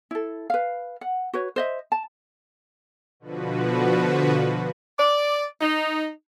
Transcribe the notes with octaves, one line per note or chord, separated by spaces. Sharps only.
E4 A4
B4 F5
F#5
F#4 B4 C#5
C5 D#5 E5
A5
B2 D3 F3 F#4 B4
D5
D#4